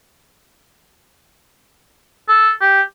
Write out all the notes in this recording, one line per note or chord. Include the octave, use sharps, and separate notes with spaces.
A4
G4